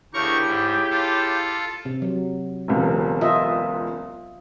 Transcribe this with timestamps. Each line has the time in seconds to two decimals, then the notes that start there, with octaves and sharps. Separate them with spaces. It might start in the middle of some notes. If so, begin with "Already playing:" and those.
0.14 D2 C#3 E4 G4 A#4 C#6
0.47 G#2
0.91 F4 A4
1.85 C3
2.02 F#3
2.68 E1 C#2 C3
3.21 F4 D#5 E5